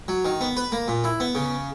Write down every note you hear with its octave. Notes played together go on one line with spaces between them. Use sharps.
F#3
D#3
B3
B4
A#3
A#2
E4
B3
C#3